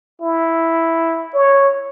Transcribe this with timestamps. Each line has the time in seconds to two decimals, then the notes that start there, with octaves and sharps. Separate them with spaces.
0.22 E4
1.34 C#5